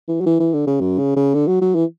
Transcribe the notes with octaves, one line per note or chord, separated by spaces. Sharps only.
E3
F#3
E3
E3
D3
C#3
F#2
C#3
C#3
D3
F#3
F#3
E3